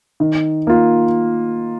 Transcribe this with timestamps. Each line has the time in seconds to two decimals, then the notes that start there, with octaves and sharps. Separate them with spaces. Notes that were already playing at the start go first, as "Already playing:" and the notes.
0.20 D#3
0.67 A#3 F4